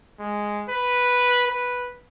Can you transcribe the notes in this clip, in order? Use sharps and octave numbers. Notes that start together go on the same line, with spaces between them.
G#3
B4
B4